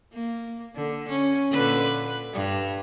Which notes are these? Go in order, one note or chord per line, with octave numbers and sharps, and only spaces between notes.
A#3
D3
C#4
A#2 D3 B4
G2